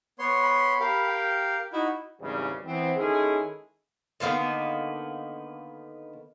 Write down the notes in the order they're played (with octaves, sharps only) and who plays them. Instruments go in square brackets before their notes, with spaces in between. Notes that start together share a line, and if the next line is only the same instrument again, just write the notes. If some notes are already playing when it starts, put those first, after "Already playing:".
[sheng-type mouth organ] B3 C#5 C6
[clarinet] B5
[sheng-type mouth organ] G4 A#4 F5
[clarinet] G5
[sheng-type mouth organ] D#4 F#4 [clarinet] E4
[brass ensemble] G#1 E2 C#3 G3
E3 B3 C4
D#3 G#3 C#4 E4 G#4 A4
[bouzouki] D3 D#3 A#3 B3